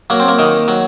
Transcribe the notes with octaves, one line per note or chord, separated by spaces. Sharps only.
F#3 A#3
C4
A#3
D#3
F#3